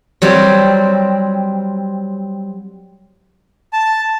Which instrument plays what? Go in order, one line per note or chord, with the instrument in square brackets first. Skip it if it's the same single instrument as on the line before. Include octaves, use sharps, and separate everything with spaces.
[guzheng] F#3 G3 C4
[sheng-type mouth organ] A5